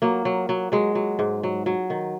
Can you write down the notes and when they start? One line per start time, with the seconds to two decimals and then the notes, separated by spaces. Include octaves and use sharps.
0.02 F#3 A#3
0.25 F#3
0.49 F#3
0.72 F#3 G#3
0.95 F#3
1.19 G#2
1.43 F#3
1.66 F#3
1.90 D#3